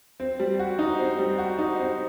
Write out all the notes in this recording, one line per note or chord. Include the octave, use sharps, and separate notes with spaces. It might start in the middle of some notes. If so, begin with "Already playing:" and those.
C4
G3
F#4
D#4
C4
G3
F#4
D#4
C4